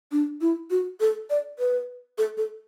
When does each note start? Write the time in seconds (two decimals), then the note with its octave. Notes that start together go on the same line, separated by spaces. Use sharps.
0.12 D4
0.41 E4
0.71 F#4
1.00 A4
1.30 D5
1.59 B4
2.18 A4
2.37 A4